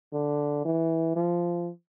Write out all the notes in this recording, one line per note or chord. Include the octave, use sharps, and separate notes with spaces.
D3
E3
F3